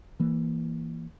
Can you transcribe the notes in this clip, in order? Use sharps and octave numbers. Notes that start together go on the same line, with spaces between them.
E3 A#3